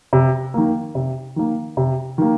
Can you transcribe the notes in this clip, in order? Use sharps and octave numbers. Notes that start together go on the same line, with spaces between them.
C3
D#3 A#3
C3
D#3 A#3
C3
D#3 A#3